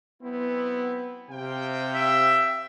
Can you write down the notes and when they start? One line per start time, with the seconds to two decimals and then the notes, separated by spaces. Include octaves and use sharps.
0.23 F#3 B3 C4 E4
1.30 C3 C5 F5 G5
1.94 E5